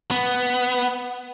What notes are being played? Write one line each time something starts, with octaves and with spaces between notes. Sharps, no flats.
B3